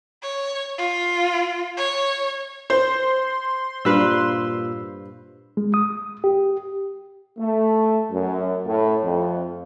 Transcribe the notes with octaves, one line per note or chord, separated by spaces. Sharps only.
C#5
F4
C#5
C5 C6
G2 A#2 B4 F5 E6
G#3
D#6
G4
A3
F#2
A2
F2